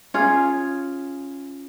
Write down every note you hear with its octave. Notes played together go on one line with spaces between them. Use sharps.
C#4 F4 G#4